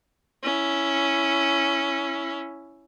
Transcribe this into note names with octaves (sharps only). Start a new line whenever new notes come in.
C#4 E4